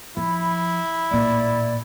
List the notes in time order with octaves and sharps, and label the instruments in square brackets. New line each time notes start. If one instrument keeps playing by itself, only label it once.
[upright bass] F3 [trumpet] E4 [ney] B5
[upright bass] A1 A#2 [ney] D5